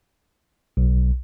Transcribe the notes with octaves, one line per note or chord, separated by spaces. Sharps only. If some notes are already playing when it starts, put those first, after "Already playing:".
B1